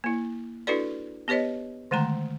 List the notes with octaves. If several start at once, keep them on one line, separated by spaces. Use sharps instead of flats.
A#3 E4
D4 E4 F#4 A4 B4 D5
B3 G4 B4 C#5 D#5
D3 D#3 G#3 A3 A#5